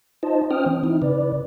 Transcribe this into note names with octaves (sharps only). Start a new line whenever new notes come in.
D#4 F4 C5 D#5 A5
C#4 C5 G5 D#6 F6
E3 C4
D#4 E4
C#3 B4 D5